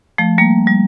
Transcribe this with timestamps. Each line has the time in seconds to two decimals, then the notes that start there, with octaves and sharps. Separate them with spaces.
0.18 F3 A3
0.38 G3 A#3
0.67 G3